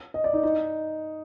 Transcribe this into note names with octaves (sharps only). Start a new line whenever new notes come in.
D#5
D5
D#4
D#4